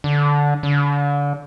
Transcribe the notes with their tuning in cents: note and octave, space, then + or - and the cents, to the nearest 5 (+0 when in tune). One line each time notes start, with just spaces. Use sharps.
D3 -10
D3 -35